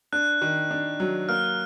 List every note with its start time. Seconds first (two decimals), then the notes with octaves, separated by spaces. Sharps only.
0.13 D4 F#6
0.42 D#3
0.71 D4
1.00 F#3
1.29 A#3 F6